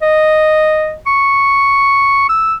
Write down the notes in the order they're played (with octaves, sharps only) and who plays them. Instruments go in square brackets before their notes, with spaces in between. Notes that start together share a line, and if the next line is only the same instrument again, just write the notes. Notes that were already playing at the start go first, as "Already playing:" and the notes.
[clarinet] D#5
C#6
E6